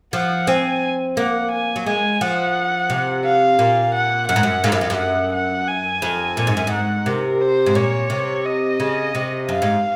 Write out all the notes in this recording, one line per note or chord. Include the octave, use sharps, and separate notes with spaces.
F3 F#5
C4 G#5
A#3 F#5
G#5
F#3
G#3 G#5
F3 F#5
C3
F5
A#2
F#5
F#2 F#5
G#2
F#2
G#2 F5
F#2
F2
F#2
F#5
F#5
G#5
F2
A#2
G#2
F#2
G#2 F#5
C3 A#4
C5
G#2
A#2 C#5
C3
D#5
C#3
C3
F#2 F5
G#2